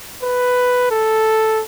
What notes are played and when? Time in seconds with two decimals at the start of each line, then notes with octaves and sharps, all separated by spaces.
0.22 B4
0.91 A4